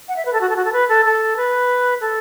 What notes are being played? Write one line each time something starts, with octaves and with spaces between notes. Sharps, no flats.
F#5
E5
B4
A4
F#4
A4
F#4
A4
B4
A4
A4
B4
A4